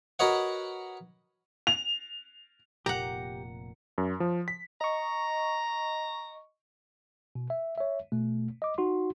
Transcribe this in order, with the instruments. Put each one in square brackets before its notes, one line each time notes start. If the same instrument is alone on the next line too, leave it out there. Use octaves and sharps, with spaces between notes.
[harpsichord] F#4 A#4 B4 C#5 D#5 F#5
[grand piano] F7
[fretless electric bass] F1 [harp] A#2 [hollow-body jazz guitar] G4 [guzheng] F#5 A#5
[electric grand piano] F#2
F3
B6
[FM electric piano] D#5 C#6 [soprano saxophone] A#5
[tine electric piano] B2
E5
C#5 E5
B2 A3
D#5 D6
D#4 F#4 C6